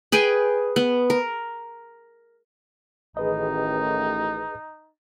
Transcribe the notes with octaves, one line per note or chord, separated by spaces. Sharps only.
G#4 B4 G5 G#5
B3
A#4
A1 D#3 D#4 G#4 B4 D#5